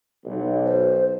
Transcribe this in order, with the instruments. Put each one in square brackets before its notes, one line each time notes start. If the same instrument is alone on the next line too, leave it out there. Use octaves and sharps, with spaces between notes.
[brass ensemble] B1
[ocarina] C5